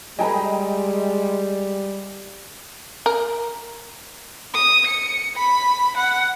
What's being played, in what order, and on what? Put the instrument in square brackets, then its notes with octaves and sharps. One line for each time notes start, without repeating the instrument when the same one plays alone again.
[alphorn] G3 [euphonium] G#3 [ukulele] G#4 A4 B4 [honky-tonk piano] D#5 G5 A#5
[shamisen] A#4
[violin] D#6
C#7
B5
F#5